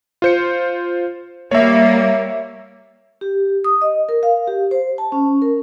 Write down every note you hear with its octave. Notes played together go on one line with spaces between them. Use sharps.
F4 C5 C#7
G3 A#3 C#5 E5
G4
D#6
D#5
A#4
F5
G4
C5
A5
C#4
A#4